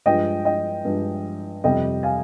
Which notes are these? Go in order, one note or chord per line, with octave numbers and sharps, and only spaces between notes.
G2 F3 G#3 D#5 G5
D#5 G5
G2 F3 G#3
F2 C3 G3 D#5 G5
F5 G#5